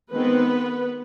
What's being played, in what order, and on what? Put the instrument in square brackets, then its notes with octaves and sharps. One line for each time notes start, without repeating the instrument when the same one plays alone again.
[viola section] D#3 G#3 B3 C4 B4